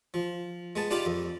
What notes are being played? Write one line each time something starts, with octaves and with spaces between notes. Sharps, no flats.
F3
G#3 B3 A5
D4 D#4 F4 G4 D5 B5
F2